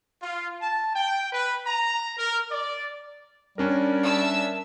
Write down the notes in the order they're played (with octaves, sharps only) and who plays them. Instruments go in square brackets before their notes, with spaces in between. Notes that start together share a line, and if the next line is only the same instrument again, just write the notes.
[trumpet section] F4
A5
G5
B4
A#5
A#4
D5
[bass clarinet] G3 [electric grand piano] C#4 D4 A#4
[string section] E5 A5 E6